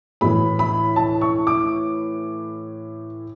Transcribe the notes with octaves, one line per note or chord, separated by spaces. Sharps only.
A2 E3 B5
B5
A5
C#6
D6